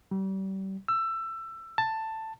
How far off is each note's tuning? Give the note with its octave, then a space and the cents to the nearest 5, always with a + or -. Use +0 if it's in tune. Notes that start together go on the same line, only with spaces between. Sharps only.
G3 -35
E6 +20
A5 +10